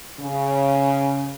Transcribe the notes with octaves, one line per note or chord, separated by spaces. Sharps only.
C#3